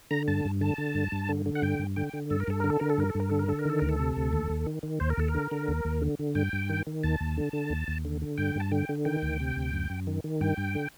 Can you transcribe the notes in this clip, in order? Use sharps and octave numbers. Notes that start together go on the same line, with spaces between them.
D3 A#5
G2 A5
G2
D3 A5
D3
G2
G2
D3
D3
F#5
G2 G5
G2
D3 G5
D3
G2 A4
A#4
G2 A4
D3 A#4
A4
D3 A#4
A4
G2 A#4
A4
G2
A#4
D3 A4
A#4
D3 A4
A#4
D#3 A4
D2 A#4
A4
C3
D2
D#2
D#2
D#3
D#3
D#2 C5
A#4
D#2 A4
A#4
D3
D3
D#2
D#2
D3
D3
G2 G5
G2
D#3
D#3
D#2 A5
D#2
D3
D3
D#2
D#2
D3
D3
G2 G5
G2 A5
D3 G5
D3
D#3 G5
D2
C3
D2
F#2
F#2
D#3
D#3
G2 G5
G2
D3